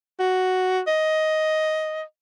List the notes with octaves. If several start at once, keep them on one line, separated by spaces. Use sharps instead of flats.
F#4
D#5